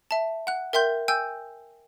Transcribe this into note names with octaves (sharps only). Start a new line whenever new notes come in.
E5 A5
F#5 F#6
A#4 E5 G5 C6 G6
G5 G#5 E6 G6